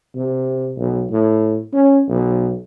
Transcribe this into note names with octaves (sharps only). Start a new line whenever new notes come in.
C3
B1
A2
C#4
B1